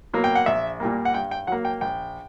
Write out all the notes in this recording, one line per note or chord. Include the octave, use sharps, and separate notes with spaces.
B2 F#3 A#3
G5
F#5
A#1 E5
A#2 G3 A#3
F#5
G2 G5
G5
F#3 A#3 F#5
G5
A#1 G5